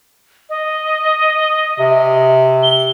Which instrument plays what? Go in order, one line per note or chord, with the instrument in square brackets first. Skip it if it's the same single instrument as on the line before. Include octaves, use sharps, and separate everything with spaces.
[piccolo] D#5
[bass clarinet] C3
[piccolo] G7